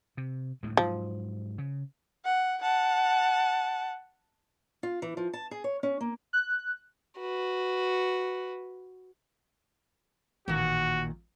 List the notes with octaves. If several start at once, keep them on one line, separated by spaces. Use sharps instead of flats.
C3
D2 A2 G#3
G#2 F3 F#3
C#3
F#5
F#5 A5
F4
E3
F3
A5
G#4
C#5
C#4
A#3
F#6
F#4 B4
A1 A#2 D#3 F#4